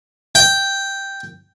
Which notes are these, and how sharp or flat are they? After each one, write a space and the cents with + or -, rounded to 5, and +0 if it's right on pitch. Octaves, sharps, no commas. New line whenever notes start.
G5 +0